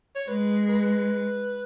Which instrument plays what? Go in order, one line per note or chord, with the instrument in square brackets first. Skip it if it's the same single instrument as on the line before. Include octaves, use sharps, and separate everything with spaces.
[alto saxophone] C#5
[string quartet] G#3 [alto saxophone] B4
[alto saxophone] B4